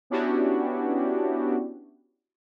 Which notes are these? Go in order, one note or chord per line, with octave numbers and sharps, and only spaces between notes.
B3 C#4 D4 E4 F#4 G4